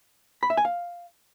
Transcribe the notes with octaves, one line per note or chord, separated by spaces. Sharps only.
B5
E5
G#5
F5